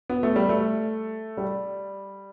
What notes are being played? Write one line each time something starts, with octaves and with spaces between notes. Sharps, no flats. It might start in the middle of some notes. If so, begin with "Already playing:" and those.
B3
A3
G3
A3
G3